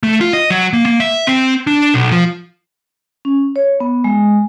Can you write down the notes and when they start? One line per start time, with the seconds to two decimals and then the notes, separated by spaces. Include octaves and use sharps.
0.03 A3
0.21 F4
0.33 D#5
0.50 F#3
0.73 A#3
0.86 A#3
1.00 E5
1.27 C4
1.67 D4
1.94 B1
2.12 F3
3.25 C#4
3.56 C#5
3.80 B3
4.04 G#3